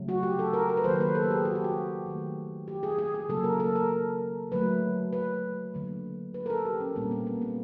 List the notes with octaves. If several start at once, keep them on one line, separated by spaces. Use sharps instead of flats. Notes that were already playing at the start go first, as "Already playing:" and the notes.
Already playing: C#3 F#3 A3
F#4
G4
A4
A#4
A#4
B4
D#3 F#3 A#3 C5
B4
A4
G4
G#4
F#4
G4
F#4
D#3 F#3 A3
G4
G#4
G#4
G#4
C#3 F#3 A#3 A4
A#4
A4
A#4
D3 F#3 A3 B4
B4
D3 F#3 A#3
B4
A#4
A4
G4
C#4
A#2 G3 A#3 C4
B3
A#3
B3